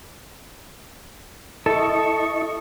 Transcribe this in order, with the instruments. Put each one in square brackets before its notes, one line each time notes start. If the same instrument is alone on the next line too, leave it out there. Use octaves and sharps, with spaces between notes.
[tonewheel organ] E4 D#5 C#6 [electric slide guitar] A4